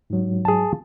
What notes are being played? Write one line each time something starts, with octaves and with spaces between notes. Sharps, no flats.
G#2 F#3
G#4 A5